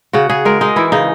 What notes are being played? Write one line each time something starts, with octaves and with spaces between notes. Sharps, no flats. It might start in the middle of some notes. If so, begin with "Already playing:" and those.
C#3 F#4
C#3 G#4
G#3 A#4
G#3 D#4
E3 E4
C#3 D#4